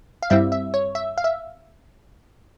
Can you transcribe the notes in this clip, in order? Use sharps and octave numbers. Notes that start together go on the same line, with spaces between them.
F5
G2 G3 C4 E4 E5
E5
C#5
E5
F5
E5